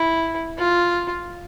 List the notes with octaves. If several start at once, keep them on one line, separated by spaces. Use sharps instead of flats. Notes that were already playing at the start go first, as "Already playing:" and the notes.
Already playing: E4
F4